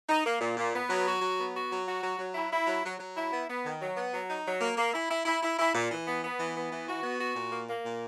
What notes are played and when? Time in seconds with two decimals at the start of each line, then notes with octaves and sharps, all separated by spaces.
0.09 D#4
0.25 A#3
0.41 A#2
0.57 A#2
0.74 B3
0.89 F#3
1.07 F#4
1.22 F#3
1.39 B3
1.55 F#4
1.71 F#3
1.87 F#4
2.03 F#3
2.19 F#3
2.35 E4
2.51 E4
2.67 F#3
2.84 F#3
2.99 F#3
3.16 E4
3.32 B3
3.48 B3
3.65 D#3
3.81 F#3
3.96 B3
4.13 F#3
4.30 D#4
4.45 F#3
4.61 A#3
4.78 A#3
4.93 E4
5.09 E4
5.26 E4
5.42 E4
5.59 E4
5.74 A#2
5.91 E3
6.06 B3
6.24 B3
6.39 E3
6.55 B3
6.72 E3
6.88 F#4
7.03 B3
7.19 F#4
7.36 A#2
7.52 A#3
7.68 A#3
7.85 A#2